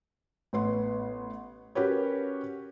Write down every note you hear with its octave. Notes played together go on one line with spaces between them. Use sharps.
A1 B3 C6
C#4 F#4 G4 A#4 B4 C#5